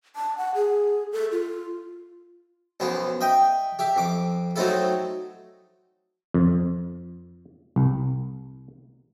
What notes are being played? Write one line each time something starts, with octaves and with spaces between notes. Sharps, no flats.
A5
F#5
G#4
A4
F4
B1 F#2 F3 B3
D#5 E5 G5
G4 E5
F2 D6
F#3 A3 C4 D#4 E4 A4
F2
C2